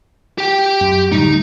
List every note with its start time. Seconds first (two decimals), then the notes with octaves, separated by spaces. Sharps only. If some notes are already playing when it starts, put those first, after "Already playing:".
0.38 G4 G5
0.81 F#2
1.12 D2 A2 G3 D#4